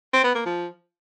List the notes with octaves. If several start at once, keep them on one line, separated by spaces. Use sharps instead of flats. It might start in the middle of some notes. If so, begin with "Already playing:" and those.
C4
B3
A#3
F3